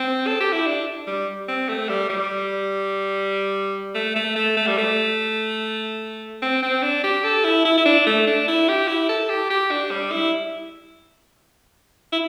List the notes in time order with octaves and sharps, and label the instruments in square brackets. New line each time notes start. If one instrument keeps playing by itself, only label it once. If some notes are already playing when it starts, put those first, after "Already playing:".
Already playing: [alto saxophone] C4
A4
G4
E4
D4
G3
C4
A3
G3
G3
A3
A3
A3
A3
G3
A3
C4
C4
D4
G4
A4
E4
E4
E4
D4
A3
D4
E4
G4
E4
A4
G4
G4
D4
G3
E4
E4